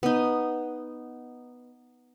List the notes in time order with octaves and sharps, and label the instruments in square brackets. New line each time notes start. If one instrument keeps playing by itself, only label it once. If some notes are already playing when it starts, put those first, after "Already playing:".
[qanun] B3 D#4